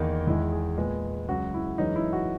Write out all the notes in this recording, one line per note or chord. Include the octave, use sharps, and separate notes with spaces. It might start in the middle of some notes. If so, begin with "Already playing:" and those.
Already playing: E2 D#3 A#3 D#4
E2 D#3 G#3 E4
G#4
A#2 G#3 B3
C#2 C#3 F#3 F#4
E4
F#2 E3 G#3 C#4 D#4
E4
F#4